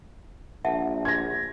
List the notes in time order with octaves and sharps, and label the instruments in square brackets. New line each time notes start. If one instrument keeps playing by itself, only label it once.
[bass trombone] A#1 [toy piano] E5 F#5 A5
[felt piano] G#6 A#6